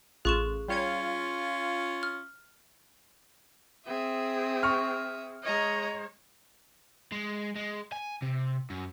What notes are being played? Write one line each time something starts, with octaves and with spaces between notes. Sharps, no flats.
A1 F4 G#4 C#6 F#6 E7
G3 C#4 F4 C#5 G#6
F6
C4 G#4 E5 D#6
C#6 F6
G#3 C#5 D#5 A#5
G#3
G#3
G#5
C3
F#2